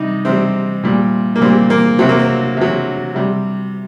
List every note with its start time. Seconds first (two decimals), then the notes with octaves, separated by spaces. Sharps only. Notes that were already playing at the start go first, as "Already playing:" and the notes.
Already playing: C3 G3 D#4
0.25 C3 G3 C4
0.83 A#2 G3
1.36 A#3
1.41 A#2 G3 C4
1.70 A#3
1.99 C3 F#3 C4
2.09 A#3
2.19 C4
2.57 C3 F#3
3.15 C3 G3